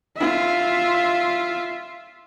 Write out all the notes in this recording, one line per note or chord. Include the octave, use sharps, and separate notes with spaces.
F4 E5